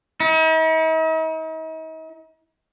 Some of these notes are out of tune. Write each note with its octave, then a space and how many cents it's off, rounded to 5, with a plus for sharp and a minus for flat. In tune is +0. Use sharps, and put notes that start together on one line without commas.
D#4 +45